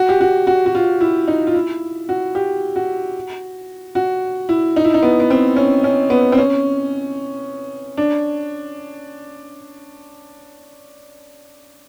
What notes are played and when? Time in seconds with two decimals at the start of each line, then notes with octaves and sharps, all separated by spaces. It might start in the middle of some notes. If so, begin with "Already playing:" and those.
Already playing: F#4
0.09 G4
0.21 F#4
0.47 F#4
0.66 F#4
0.75 F4
1.01 E4
1.28 D#4
1.47 F4
1.55 E4
2.09 F#4
2.35 G4
2.76 F#4
3.95 F#4
4.49 E4
4.76 D#4
4.84 E4
4.94 D#4
5.03 B3
5.20 B3
5.30 C4
5.56 C#4
5.84 C#4
6.10 B3
6.32 C4
6.38 C#4
7.97 D4